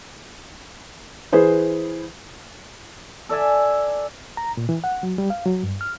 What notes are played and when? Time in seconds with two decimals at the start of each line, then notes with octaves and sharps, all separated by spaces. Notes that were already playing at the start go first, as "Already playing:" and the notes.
1.32 E3 G#4 B4 C5
3.29 A4 D5 E5 G#5
4.37 A#5
4.57 A#2
4.69 E3
4.84 F#5
5.03 F#3
5.18 G3
5.30 F5
5.46 F#3
5.63 G2
5.81 F6